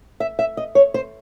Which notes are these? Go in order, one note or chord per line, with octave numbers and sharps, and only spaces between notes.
E5
E5
D#5
C#5
C5